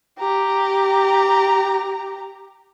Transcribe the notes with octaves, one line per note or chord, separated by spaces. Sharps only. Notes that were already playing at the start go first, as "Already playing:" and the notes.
G4 A#5